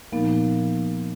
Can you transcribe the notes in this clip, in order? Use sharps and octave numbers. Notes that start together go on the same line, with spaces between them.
A#2 F3 A#3 B3 D#4